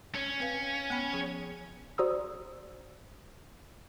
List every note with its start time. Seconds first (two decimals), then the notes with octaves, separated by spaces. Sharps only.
0.15 C#4
0.40 C4 B4 F5
0.90 B3 G5 B5
1.13 F3 G#4
1.98 F#4 C5 D5 A#5 D#6 E6